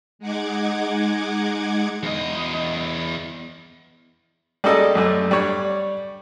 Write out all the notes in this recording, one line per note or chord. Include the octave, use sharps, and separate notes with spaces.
G#3 D#4 F#5 D6 G#6
E2 D#5
G3 G#3 A#3 C#4 A4 D#5
F#2 G3 A3
G3 D4 C#5